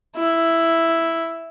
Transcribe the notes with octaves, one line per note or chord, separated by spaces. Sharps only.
E4